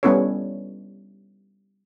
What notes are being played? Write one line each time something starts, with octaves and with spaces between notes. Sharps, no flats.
G3 B3 C#4 E4 A4 C#5